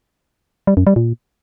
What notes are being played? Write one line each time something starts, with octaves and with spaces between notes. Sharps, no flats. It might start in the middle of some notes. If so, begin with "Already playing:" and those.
G3
F#2
G3
A#2